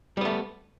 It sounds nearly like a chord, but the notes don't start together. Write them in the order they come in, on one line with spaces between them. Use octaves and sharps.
G3 B3 A3